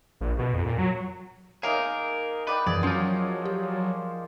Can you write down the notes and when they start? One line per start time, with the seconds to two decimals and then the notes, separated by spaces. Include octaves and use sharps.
0.21 A#1
0.38 B2
0.54 F2
0.66 A#2
0.78 F#3
1.63 A#3 D#4 G#4 A#4 C#5 E5
2.47 D#4 B4 D5 G5
2.67 F#2 E3 F3 G#4 D5
2.83 F3 F#3 C#4 F4 C5 F#5
3.46 G4